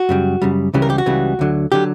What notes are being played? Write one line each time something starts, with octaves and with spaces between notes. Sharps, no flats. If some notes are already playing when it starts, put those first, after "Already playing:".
Already playing: F#4
F#2 C#3 G3
F#2 C#3 G3
C#2 C#3 E3 G3
A#4
G4
F#4
C#2 C#3 E3 G3
D2 D3 F#3
D3 F#3 G4